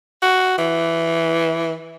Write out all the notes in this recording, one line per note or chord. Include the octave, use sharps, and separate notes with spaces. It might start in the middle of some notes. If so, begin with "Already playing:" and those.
F#4
E3